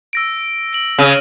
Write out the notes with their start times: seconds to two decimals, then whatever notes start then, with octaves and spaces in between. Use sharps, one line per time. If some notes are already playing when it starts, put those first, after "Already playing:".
0.13 E6 A#6 D7
0.73 D7 F#7
0.99 C#3 F6 A#6 D#7